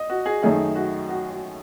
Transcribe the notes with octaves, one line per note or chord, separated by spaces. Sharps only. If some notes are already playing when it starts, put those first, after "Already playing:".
Already playing: D#5
F#4
G#4
F#2 D#3 A3 D#4 G#4
F#4
F#4
F#4